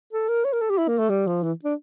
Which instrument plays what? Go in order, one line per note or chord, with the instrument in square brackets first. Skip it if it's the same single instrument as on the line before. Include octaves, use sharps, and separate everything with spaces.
[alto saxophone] A4
A#4
C#5
A#4
A4
G4
E4
A#3
A3
G3
F3
E3
D4